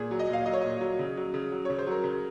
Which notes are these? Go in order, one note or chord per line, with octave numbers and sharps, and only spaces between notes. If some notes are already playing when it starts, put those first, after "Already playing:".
Already playing: A#2 G#4
F#3
D#5
A#2 F5
F#3 D#5
C#5
A#2 D#5
F#3
C#3
F#3
C#3
F#3
C#3 C#5
C5
F#3 A#4
C#3